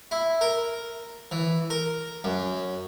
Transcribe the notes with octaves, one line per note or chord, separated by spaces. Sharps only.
E4
A#4
E3
A#4
F#2